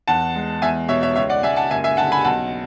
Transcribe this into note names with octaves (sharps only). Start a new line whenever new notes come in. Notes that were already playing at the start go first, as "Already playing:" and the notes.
E2 F#5 A5
G#3
E2 E5 G#5
B2 C#5 E5
C#5 E5
C#2 C#5 E5
D5 F#5
C#2 E5 G#5
F#5 A5
F#1 E5 G#5
E5 G#5
D3 F#5 A5
G#5 B5
B1 F#5 A5